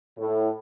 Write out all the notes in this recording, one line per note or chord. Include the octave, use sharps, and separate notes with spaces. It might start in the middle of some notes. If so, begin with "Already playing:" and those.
A2